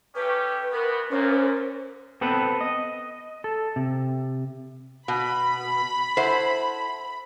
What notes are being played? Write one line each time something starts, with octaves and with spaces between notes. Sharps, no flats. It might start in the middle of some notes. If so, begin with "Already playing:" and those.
A3 C#4 G4 B4
D2 B2 B3 A#4
F#2 A#2 C#4 C5
B3 C4 A4 B4
D#5
A4
C3
B2 B5
E4 A4 C5 F#5